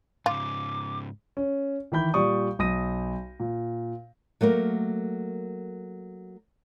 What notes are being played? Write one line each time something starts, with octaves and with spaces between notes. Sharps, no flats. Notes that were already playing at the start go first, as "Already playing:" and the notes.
G#2 C#3 F4 D6
C#4
D#3 E3 B5 G6
A#2 G3 D5 C#6 D#6
B1 D#6 A#6 D#7
A#2
F#3 A3 A#3 A#4